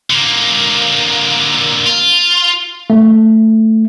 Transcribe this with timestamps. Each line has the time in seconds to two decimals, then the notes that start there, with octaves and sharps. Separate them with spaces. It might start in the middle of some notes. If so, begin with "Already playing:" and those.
0.10 D3 A#3
1.86 F4
2.90 A3